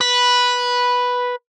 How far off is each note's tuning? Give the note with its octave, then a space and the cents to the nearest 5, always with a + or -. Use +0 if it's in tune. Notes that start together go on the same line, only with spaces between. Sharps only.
B4 -5